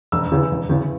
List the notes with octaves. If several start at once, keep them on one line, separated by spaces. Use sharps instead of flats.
E1 E6
E2 C#3 E3
E1
E2 C#3 E3